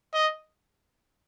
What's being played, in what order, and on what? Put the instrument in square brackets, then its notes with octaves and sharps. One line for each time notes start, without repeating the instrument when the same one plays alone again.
[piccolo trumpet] D#5